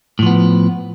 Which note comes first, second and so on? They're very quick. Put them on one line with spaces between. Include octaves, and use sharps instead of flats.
A2 F3 B3